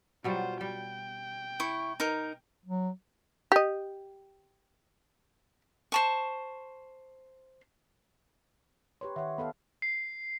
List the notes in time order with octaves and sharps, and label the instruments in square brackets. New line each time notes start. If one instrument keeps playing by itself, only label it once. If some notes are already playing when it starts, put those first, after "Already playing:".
[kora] B2 F#3 G3 [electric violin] F4 C5
[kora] G3 [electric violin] G5
[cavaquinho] E4 C#6
D#4 A#4
[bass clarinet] F#3
[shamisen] G4 D#5
[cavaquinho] C5 A5 C#6
[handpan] G4 B4 C#5 [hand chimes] C6
[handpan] D#3 C#5 [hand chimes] E5 F#5
[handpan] B3 A4 F5 [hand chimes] B5
[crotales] C7